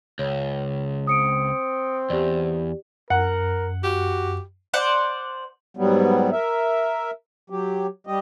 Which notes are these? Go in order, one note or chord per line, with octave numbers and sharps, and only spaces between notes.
C#2 C#5
C4 D#6 C#7 D7
E2 G4 D5
F#2 A#4 F#5
F#4 G4
C5 D5 F#5
G#2 F#3 G3 B3
A#4 E5
F#3 G4
G3 G4 D#5